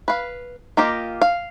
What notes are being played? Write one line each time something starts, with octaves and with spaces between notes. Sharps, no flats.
B4 F5
A#3 F4 G4 D#5
F5